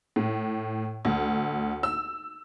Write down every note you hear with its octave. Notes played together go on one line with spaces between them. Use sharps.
A2
D2
E6